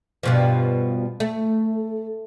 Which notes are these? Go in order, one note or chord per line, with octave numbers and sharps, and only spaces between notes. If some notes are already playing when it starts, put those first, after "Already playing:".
G2 B2 F3
A3